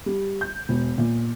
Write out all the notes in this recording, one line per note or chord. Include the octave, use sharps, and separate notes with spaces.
G3
G6
E1
A#2